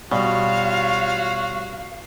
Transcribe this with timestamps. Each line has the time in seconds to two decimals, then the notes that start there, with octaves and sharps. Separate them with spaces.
0.11 B2 G3 F4 F#4 C#5 F5